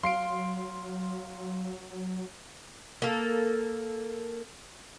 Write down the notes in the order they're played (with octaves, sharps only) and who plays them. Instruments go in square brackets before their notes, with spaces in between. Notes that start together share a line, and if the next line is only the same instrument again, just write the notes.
[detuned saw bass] F#3 [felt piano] F5 [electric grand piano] C6 C7 D7
[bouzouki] A#3 A4